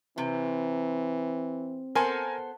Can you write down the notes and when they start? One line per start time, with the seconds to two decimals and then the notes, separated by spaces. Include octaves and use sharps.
0.18 C3 E3 C4
1.95 B3 A4 A#4 C5 G#5 A5